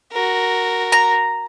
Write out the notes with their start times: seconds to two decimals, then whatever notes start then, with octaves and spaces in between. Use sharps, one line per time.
0.12 F#4 A#4
0.92 A#5